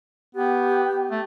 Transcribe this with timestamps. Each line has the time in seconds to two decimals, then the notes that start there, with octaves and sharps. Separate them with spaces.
0.35 B3 G4
1.11 A3